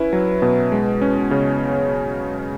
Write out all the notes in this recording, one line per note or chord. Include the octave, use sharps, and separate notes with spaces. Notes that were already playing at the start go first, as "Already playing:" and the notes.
Already playing: C#4 E4 B4
F#3
B2
G#3
C#4
C#3 C#5